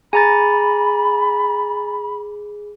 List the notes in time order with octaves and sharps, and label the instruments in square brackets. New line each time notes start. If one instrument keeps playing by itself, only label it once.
[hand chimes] G#4 [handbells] G#5 A#5 A6 [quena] B5